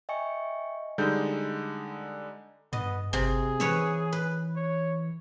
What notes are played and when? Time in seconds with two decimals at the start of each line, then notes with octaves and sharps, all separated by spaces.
0.09 D#5 E5 G5 G#5 C#6 C#7
0.98 D3 G3 G#3 D#4 G6
2.73 G2 B3 D#5
3.13 G1 C3 G#4
3.60 E3 B4 C#5 E5
4.12 B4
4.56 C#5